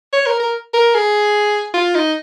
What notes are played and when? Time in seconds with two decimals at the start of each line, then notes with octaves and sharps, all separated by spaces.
0.13 C#5
0.26 A#4
0.40 A#4
0.74 A#4
0.95 G#4
1.74 F4
1.95 D#4